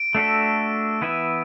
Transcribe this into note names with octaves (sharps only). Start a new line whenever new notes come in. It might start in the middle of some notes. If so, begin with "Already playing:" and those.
Already playing: D7
A3 D4 F#4 A4 E5
E3 B3 E4 B4 E5